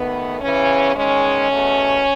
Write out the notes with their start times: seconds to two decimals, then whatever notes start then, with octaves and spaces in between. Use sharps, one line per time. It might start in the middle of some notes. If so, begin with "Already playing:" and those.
Already playing: D#2 D#3 A3 B3
0.41 E2 C#3 E3 B3 C#4
0.96 E2 D#3 G#3 C#4
1.51 E2 B2 A3